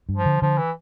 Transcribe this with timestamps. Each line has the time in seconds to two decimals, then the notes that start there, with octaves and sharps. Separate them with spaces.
0.09 G2
0.16 F3
0.25 D3
0.42 D3 F3
0.58 E3